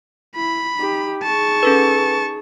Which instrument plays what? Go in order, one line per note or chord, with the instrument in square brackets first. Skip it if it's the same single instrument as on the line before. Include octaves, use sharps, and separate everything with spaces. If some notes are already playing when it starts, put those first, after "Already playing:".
[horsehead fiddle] E4 [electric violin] B5
[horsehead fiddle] D#4 G4
[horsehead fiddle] D#4 G#4 [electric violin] A5 C#6
[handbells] C#4 A4 B4